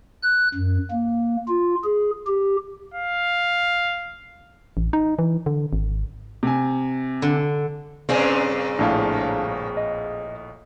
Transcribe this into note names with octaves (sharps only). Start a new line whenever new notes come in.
F#6
F#2
A#3
F4
G#4
G4
F5
A1
D#4
E3
D3
G#1
C3 G#5
D3
G2 A#2 C#3 C4 C#4 G#4
A#1 A2 D4 F5 A5
D#5